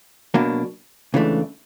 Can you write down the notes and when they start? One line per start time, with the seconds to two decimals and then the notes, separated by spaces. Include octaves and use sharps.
0.34 B2 F#3 A#3 D4
1.14 C#2 C#3 E3 A3 D4